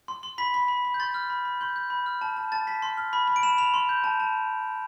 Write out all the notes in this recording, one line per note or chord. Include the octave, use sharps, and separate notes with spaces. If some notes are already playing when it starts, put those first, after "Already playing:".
C6
C6
B5 B6
B5
B5
B5
G6
C6 A6
F6
B5
B5
C6 G6
G6
B5
F6
A5
A5
A5 A6
A5 B6
C6
F6
B5
B5
D7
B5 E7
B5 F7
C6
G6
A5
A5